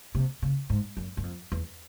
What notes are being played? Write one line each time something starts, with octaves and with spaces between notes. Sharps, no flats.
C3
C#3
G#2
F#2
F#2
F2
E2